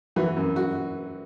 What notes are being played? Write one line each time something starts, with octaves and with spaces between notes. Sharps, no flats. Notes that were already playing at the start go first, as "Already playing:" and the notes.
E3 F#4
F#2
F#4